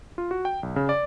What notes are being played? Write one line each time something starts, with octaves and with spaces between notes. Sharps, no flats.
F4
F#4
G5
B1
C#3
D5